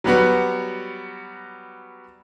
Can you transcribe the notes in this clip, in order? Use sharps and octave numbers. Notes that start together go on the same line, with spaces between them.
F#3 G3 B3 F#4